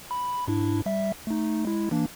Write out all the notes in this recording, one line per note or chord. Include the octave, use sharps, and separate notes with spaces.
B5
G#2 D4 E4
G3 E5
A3 D#4
G#3 E4
E3 A#3 D4